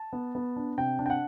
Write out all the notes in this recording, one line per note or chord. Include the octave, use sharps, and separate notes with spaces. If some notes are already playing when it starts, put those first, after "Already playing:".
Already playing: A5
B3
B3
D4
C3 G5
D4
G5
F#5